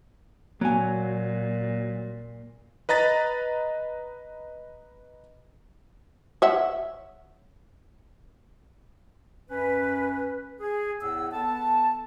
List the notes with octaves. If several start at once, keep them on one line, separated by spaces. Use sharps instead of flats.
A#2 F#3 A#3 G#5
B4 D#5 A#5 A6 B6
C#5 E5 F#5
F#2 C#4 B4
G#4
E2 A2 B3 E6
B3 A4 A5